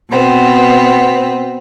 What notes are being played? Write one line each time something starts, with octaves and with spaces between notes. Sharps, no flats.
B2 B3 C4